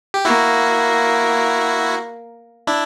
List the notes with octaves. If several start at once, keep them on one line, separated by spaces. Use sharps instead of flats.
G4
A#3 E4 F#4
D4 E4